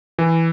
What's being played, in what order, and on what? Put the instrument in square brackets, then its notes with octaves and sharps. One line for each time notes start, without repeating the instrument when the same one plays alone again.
[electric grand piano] E3